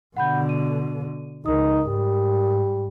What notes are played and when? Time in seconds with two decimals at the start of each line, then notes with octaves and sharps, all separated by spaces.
0.17 B2 D3 F#5 B5 G6
0.49 D#7
1.46 C#2 D#4 A#4 D#6
1.88 G#2 G3